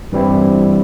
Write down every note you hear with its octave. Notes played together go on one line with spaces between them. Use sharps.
G2 E3 G3 C4 E4